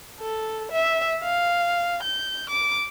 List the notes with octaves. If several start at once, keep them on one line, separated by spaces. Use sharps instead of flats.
A4
E5
F5
G6
D6